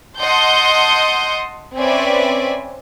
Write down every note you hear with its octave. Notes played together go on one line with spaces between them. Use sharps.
D#5 F#5 A5 C6 G6
C4 C#4 B4 D5 E5 G#5